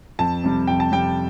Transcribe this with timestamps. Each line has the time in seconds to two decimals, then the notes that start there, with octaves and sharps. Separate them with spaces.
0.19 F2 A5
0.44 C3 G3
0.67 F2 G5
0.80 A5
0.92 C3 G3 G5